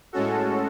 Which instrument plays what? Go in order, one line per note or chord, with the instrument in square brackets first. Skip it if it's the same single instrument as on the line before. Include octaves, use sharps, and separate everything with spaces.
[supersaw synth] A2 G#3 C#4 F#4 A4